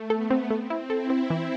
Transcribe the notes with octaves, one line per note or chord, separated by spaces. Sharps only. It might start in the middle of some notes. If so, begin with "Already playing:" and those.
Already playing: A3
B3 A4
C4
A3 C4
E4
E4 A4
C4
E3